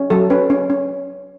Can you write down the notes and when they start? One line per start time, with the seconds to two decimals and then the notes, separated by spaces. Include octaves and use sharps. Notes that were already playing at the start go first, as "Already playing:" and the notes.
Already playing: C#4
0.10 F#3 A4
0.30 C#4 B4
0.50 C#4
0.70 C#4